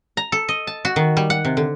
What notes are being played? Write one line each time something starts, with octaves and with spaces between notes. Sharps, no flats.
A#5
A4
D#5
A5
F#4
D#3
G3
F#5
C3
D3